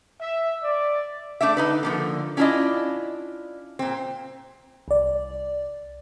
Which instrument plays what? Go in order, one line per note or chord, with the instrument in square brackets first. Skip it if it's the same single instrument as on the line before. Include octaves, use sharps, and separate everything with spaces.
[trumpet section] E5
D5
[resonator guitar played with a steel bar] A3 D4 D5 E5
D3 D#4 B4
D3 F3 A#3
C#4 D4 E4 F4 D5 D#5
A#2 C4
[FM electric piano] C2 D5